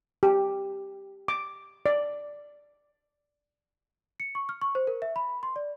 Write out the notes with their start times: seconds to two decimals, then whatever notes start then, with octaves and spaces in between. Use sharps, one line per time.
0.23 G4
1.28 D6
1.86 D5
4.20 C#7
4.35 C#6
4.49 F6
4.62 C#6
4.75 C5
4.87 A#4
5.02 E5
5.16 B5
5.43 C6
5.56 D5